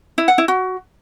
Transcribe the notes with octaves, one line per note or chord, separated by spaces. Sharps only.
E4
F#5
E4
F#4